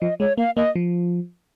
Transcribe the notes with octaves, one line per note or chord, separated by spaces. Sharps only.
F3 D#5
G#3 C#5
A#3 F5
A#3 D#5
F3